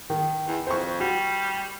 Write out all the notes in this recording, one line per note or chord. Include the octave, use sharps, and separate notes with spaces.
D#3
E2
F2 C5 C#6
G3 F#4